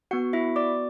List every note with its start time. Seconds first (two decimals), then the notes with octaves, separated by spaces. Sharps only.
0.11 B3 F#4 F#5
0.33 E4 E5
0.56 D5 D6